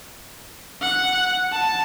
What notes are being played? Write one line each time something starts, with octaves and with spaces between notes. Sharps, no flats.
F#5
A5